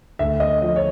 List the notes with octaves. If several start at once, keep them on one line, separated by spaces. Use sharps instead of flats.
D2 E5
D#5
F3 D#5
C#5